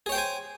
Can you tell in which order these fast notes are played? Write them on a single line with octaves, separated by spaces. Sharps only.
G#4 C#5 G5 C5 G#5